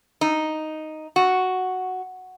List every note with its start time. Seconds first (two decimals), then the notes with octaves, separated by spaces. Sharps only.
0.21 D#4
1.16 F#4